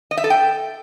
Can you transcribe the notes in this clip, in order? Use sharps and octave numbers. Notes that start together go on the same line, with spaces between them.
D#5
E5
A4
G5